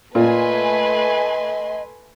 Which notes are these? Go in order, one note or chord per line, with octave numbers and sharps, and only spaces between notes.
A#2 A3 B4 D#5 G#5 C6